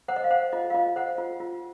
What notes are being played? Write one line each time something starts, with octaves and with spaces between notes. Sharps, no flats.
C5 F#5
D#5
F5
C5 F#5
F4 D#5
F5
F4 D#5
C5 F#5
F4
F4